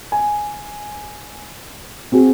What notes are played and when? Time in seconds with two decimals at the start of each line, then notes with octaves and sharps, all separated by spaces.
0.12 G#5
2.12 C4 F#4 G#4